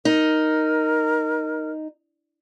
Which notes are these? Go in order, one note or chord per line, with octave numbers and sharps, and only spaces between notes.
D#4 A#4